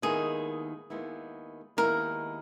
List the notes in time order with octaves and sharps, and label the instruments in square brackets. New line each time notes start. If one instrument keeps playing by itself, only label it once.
[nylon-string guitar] D#2 D#3 G#3 B3 E4 [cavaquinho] G#4
[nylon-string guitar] D#2 D#3 G#3 B3 E4
[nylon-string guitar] D#2 D#3 G#3 B3 E4 [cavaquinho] A#4